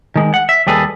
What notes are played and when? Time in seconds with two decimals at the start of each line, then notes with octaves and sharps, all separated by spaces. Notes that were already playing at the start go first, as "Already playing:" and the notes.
0.16 D#3 G#3
0.34 F#5
0.49 E5
0.67 D#2 G3 G#4 A4 B4